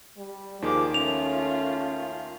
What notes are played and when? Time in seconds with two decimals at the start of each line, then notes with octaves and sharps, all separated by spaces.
0.17 G3
0.62 D#2 D#3 F3 G#4 D6
0.94 A3 C#4 F4 F7